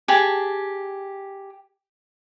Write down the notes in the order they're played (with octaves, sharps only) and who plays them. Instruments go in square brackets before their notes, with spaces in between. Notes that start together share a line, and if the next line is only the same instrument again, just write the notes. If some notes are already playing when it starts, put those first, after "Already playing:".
[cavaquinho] G4 G#4 A5